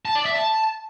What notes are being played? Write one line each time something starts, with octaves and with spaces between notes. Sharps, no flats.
A5
D5
E5
A5